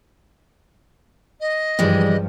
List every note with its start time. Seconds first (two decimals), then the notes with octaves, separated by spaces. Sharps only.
1.40 D#5
1.79 G2 E3 F3 G3 G#3